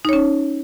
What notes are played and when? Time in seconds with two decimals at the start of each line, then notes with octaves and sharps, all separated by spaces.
0.05 D#4
0.09 C#5
0.13 C#4